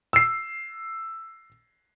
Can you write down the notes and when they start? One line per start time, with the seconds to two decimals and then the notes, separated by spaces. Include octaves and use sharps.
0.13 E6 C7